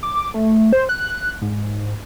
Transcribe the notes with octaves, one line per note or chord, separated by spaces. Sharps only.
D6
A3
C5
F#6
G#2